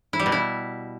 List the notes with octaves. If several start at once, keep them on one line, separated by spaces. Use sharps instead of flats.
E4
G3
B2
E4